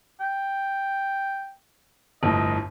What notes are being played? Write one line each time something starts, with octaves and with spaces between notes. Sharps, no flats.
G5
G1 F2 A2 D#5